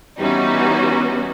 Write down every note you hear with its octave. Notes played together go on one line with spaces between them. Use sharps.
E3 G3 B3 C#4 D#4 F#4